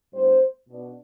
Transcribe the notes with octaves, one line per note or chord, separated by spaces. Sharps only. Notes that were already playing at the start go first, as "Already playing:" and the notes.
A2 G3 B3 D4 C5
B2 B3 D4